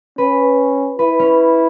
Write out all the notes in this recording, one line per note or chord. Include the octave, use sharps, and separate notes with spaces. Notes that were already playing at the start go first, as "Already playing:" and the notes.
C#4 B4
E4 B4
C#4